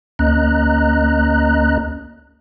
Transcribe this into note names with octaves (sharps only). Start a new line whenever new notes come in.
D2 A#3 C#4 D#5 A#5 F#6